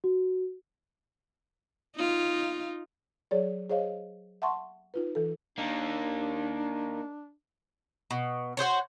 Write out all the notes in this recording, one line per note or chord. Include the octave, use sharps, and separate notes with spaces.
F#4
D#4 F4
F#3 G#4 C#5 D5
G#4 C5 C#5 D#5 F5
E5 F#5 A5 C6 C#6
D#4 F4 B4
E3 A4
A#3 D4 D#4
B2
F#4 G#4 C5 C#5